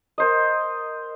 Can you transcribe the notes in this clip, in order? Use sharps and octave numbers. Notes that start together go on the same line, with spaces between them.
A#4 C5 D#5